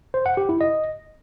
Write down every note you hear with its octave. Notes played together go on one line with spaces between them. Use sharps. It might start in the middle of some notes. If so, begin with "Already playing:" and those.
C5
F#5
G4
E4
D#5